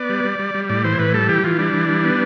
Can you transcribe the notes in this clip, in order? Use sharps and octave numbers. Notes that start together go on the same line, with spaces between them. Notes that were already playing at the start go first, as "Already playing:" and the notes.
Already playing: B3 D5
G3
G3
G3
G3
A2 D5
E3 C5
A2 B4
G3 A4
E3 G4
E3 F4
G3 D4
E3
G3
B3